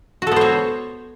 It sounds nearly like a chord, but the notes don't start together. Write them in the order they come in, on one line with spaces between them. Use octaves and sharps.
F#4 A4 B3 C5 C#5